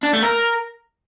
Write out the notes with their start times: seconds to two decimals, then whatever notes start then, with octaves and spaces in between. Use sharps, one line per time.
0.03 D4
0.13 A3
0.23 A#4